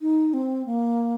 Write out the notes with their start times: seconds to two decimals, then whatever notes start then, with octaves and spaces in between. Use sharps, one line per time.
0.02 D#4
0.33 C4
0.66 A#3